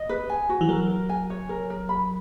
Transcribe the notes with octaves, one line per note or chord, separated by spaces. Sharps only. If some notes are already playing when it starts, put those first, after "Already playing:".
Already playing: D#5
B4
G#5
F#4
E3
F#3 A#4
A#4
G#5
C#5
A#4
A#4
B5